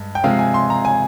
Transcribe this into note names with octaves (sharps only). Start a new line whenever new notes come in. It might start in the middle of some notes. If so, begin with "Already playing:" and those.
Already playing: G2 G#3
G5
C3 F3 G#3 F5
G#5
C6
A#5
G#5